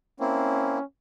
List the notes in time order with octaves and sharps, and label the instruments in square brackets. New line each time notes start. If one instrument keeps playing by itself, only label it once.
[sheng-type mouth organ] A#3 C4 E4 [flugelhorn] C#4